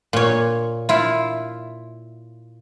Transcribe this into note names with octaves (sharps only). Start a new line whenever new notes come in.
A#2 C#5
E4 F4